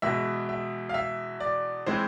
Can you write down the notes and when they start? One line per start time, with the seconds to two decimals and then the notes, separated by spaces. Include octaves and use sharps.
0.02 E2 B2 G#3 E5
0.49 E5
0.89 F5
0.94 E5
1.40 D5
1.86 E3 G#3 C4 C5